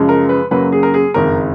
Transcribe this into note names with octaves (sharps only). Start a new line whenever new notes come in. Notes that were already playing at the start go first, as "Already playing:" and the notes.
Already playing: F#2 C#3 F3 G#3
A#4
B4
F#2 C#3 F#3 A#3 B4
G#4
A#4
G#4
F#1 F2 D#3 G#3 A#4